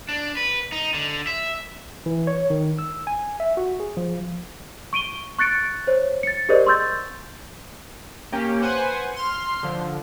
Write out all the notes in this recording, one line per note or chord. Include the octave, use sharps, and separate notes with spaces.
D4
B4
D#4
D3
E5
E3
C#5
D#3
E6
G#5
E5
F#4
G#4
F3
C#6 D7 D#7 G7
C#6 F#6 A6 C#7 D7
C5 C#5
A6 C#7
G4 G#4 A#4 C5 D5 D#5
C6 C#6 E6 G6 A6
A#3 C#4 G4
B4 C5 F#5 G#5
C6 F6
D3 F3